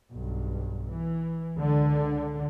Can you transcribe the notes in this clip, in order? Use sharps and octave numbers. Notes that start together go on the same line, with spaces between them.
B1 G2
E3
C#2 D3